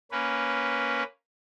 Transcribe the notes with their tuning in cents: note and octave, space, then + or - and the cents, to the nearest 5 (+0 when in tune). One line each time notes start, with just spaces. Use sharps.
A#3 +0 C#4 +0 B4 +0